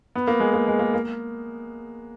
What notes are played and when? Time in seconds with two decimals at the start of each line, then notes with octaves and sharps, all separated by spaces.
0.15 B3
0.27 A#3
0.40 G#3
0.54 A#3
0.67 G#3
0.79 A#3
0.94 A#3